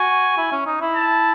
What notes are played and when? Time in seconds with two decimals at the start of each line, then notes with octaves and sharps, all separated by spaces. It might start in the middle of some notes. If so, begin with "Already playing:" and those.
Already playing: F#4 G#5
0.37 E4
0.52 C#4
0.66 D#4
0.81 E4
0.95 A5